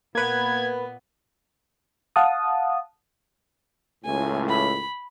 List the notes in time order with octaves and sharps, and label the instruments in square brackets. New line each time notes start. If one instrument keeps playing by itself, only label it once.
[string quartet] A#2 B3 [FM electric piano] A#3 B4 [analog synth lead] G#6
[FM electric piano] F5 F#5 A5 D#6
[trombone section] C#2 A2 [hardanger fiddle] G#5
[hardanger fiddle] B5